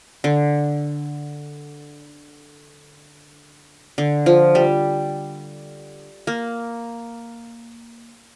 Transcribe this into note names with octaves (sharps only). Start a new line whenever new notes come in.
D3
D3
F3
G3
A#3